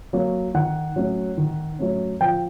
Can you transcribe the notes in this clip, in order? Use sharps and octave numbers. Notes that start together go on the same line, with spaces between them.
F#3 A#3
D#3 F#5
F#3 A3 C#4
D#3
F#3 A3 C#4
F3 G5